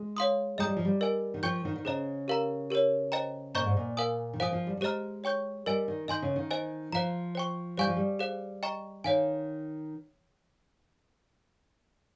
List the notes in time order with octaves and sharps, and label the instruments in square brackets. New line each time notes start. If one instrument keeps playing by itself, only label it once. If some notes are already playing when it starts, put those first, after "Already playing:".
Already playing: [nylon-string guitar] G#3
[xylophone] C#5 F5 C6 D#6
[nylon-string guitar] G#3 [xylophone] D#5 G5 A#5 D#6 G6
[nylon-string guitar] G3
F3
G3
[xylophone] A#4 D#5 G#5
[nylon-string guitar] D#3
[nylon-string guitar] F3 [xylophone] C5 G5 C#6 G6
[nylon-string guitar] D#3
D#3
[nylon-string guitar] C#3 [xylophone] G#4 C5 D#5 A#5
[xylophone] G4 A#4 F5 A#5
G4 A#4 C#5
C5 D#5 G5 A#5
[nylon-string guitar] A#2 [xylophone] C5 D#5 A#5 C#6 G6
[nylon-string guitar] G#2
A#2
[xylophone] A#4 F5 G#5 D#6
[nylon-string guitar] D#3
[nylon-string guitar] F3 [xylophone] C5 F5 G#5 D#6
[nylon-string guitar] F3
G3
G3
[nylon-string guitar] G#3 [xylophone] G4 C5 D#5 A#5 F6
[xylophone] C#5 G5 C#6 G6
[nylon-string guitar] G3 [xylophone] A#4 D#5 G#5
[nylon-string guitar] D#3
[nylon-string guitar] D#3 [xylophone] D#5 G#5 C6 G6
[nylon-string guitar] C#3
D#3
[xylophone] C5 D#5 G#5
[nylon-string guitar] F3 [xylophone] C5 F5 A#5
[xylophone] C5 G5 C#6
[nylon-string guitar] G3 [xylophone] C5 F5 G#5 C#6 G6
[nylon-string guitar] F3
G3
[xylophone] G#4 C5 F5
D#5 G5 A#5 C#6
[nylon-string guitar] D#3 [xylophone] C#5 F5 G#5